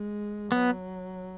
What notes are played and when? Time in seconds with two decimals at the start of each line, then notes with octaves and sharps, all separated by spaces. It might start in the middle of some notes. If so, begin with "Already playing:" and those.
Already playing: G#3
0.52 F#3 B3